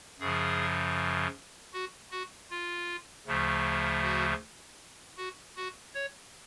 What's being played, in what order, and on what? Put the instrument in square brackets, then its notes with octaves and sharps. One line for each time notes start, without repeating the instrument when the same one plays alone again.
[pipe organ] F#2 C#3 F3 G#4
F#4
F#4
F4
D2 C#3 F3 A3
F#4
F#4
F#4
C#5